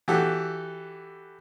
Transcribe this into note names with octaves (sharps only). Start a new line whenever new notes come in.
E3 F#4 G4 A4